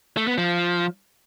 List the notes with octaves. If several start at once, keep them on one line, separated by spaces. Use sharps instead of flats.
A3
B3
F3